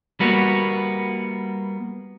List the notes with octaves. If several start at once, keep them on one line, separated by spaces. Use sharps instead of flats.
G3 A#3 B3 F#4